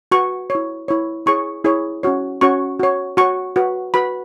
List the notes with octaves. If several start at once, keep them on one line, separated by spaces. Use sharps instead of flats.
F#4 B4 C#6
C#5
E4
E4 C#5
E4 G#4 C#5 C#6
E4 G#4 C#5
C#4 F#4 C#5
C#4 F#4 C#5 C#6
F#4 C#5
F#4 C#5 C#6
F#4 B4
F#4 B4 B5